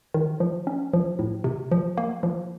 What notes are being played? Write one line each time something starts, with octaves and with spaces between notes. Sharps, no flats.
D#3
F3
C#4
F3
A2
C3
F3
A#3
F3